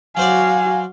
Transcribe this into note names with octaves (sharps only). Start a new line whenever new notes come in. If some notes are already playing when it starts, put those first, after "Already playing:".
F#3 F#4 C5 D5 F5 G#5